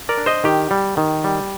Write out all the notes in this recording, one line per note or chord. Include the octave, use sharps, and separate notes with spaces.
A#4 D5
D4
C5 D#5
D#3 G4
G3
D#3
G3